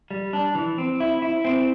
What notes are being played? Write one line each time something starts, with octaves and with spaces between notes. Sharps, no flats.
G3
D4
E3
C4
E4
E4
C4